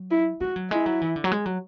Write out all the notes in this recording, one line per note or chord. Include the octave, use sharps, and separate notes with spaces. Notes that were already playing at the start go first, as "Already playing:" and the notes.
Already playing: F#3
E4
G#3 F#4
F#3
G#3 E4
F#3
E3
D3
F#3
G#3
F#3